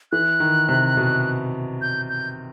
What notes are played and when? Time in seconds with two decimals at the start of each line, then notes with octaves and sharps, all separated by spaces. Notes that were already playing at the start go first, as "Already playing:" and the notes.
0.12 E3 F#6
0.40 D#3
0.69 C3
0.97 B2
1.82 G6
2.09 G6